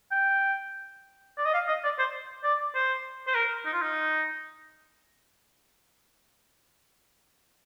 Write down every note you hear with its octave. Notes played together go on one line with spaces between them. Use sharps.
G5
D5
D#5
F5
D#5
D5
C5
D5
C5
C5
A#4
D#4
F4
D#4